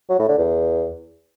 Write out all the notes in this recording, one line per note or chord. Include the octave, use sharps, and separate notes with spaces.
F#3
A2
D3
E2